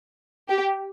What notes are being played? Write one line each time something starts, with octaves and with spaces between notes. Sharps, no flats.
G4